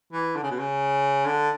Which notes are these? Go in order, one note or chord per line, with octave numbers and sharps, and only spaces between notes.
E3
D3
C#3
B2
C#3
D3